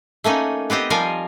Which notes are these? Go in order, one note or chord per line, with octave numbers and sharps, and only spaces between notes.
A3 A#3 C#4 D#4
B3 C4 G4 D#5
F3 G3 A#4 D#5 F5 G#5